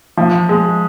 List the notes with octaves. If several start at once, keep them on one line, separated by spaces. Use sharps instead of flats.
F3
G#3